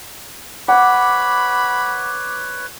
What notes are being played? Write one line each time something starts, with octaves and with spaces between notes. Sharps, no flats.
B4 C#5 F#5 B5 D6